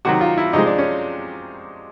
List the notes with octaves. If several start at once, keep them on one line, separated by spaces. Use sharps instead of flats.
C3 D#3 F#3 F#4
F4
E4
C3 F3 G#3 D#4
D4
C#4